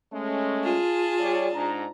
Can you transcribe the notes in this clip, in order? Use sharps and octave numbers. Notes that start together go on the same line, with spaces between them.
G#3 A3 C#4
F4 G#4 A5
G3 C#5 D5
G#2 D4 A#5